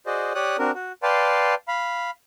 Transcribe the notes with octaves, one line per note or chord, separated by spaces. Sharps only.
F#4 G#4 C5 D5 D#5
G4 C#5 D5 D#6 F#6
C4 D4 F#4 A#4
F#4
B4 D5 F5 G5 A5 C6
F5 B5